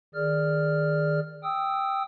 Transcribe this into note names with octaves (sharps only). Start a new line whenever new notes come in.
D#3 G#4 D5 F6
G5 D#6 E6